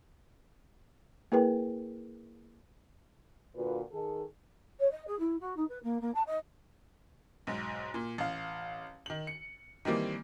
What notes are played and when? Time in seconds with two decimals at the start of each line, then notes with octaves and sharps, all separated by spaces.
1.32 A#3 E4 G#4 A#4 B4 G5
3.56 A#2 D3 F4 F#4 B4
3.92 D#3 G#4 A4
4.79 C#5
4.91 D#5
5.07 G#4
5.19 E4
5.40 F#4
5.56 D#4
5.69 B4
5.83 A#3
6.01 A#3
6.14 A5
6.27 D#5
7.47 B1 G#2
7.94 A#2
8.18 A1 F5
9.06 D#3 F#7
9.27 C#7
9.85 D#3 E3 G3 A#3 C4